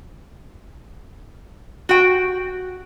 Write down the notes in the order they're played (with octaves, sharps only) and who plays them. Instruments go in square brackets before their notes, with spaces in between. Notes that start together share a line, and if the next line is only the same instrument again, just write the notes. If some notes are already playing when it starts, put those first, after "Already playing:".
[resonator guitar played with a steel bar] F#4 G5